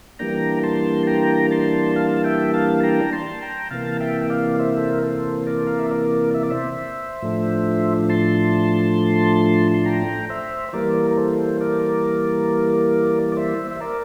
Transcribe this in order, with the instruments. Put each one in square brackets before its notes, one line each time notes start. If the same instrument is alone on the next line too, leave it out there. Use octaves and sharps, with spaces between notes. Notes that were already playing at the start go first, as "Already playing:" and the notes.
[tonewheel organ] E3 G3 A#3 D4 G5 A#5
A5 C6
G5 A#5
A5 C6
F5 A5
E5 G5
F5 A5
G5 A#5
A5 C6
G5 A#5
C3 E3 A#3 F5 A5
E5 G5
G5
D5 F5
C5 E5
A4
A#4
A4 C5
A#4 D5
F5
E5
A#4 D5
E5
D5
C5 E5
A2 F3 A3 D4
A5 C6
C6
G5 A#5
C5 E5
C5
E3 G3 A#3 A#4 D5
A#4
A4 C5
A#4 D5
D5
C5 E5
E5
A#4 D5